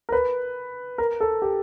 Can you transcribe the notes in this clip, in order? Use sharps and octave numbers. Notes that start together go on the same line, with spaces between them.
A#4
B4
A#4
A4
G4